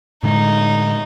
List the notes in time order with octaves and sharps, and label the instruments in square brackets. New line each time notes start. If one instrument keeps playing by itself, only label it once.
[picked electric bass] A2 D3 G#3 [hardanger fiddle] D#4